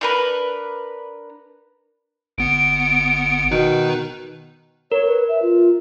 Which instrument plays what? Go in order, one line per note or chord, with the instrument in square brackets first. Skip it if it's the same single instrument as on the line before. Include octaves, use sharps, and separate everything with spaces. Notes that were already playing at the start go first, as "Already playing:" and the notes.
[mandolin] D4 A#4 B4
[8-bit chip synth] G1 B3 C#7 [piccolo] D7
[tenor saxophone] B2 [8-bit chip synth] D#3 D#4 B4
[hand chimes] A#4 [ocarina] C#5
[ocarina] B4
E5
F4